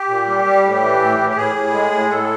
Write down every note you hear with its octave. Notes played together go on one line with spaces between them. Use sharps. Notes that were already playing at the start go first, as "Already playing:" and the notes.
Already playing: G4
A#2
G3
G3
A2
E3
A2
A2
G4
A2 G#4
A2
G#3
A2
A2 A4